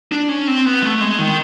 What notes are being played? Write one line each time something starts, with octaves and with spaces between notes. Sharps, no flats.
D4
C#4
C4
B3
A3
G#3
D#3